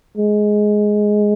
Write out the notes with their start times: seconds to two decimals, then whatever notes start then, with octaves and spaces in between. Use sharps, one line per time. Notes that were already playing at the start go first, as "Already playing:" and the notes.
0.17 G#3